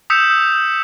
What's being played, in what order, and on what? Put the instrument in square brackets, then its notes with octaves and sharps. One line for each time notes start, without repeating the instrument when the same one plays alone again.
[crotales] D#6 E6 G6 B6 C#7 E7